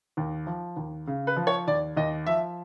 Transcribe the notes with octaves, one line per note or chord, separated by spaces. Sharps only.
D#2
F3
D#2
C#3
B4
F3
C#5
D#2 D5
D#2 D#5
F3 E5